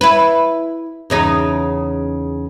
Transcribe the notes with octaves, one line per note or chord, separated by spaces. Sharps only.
E4 B4
E2 C#3 D#4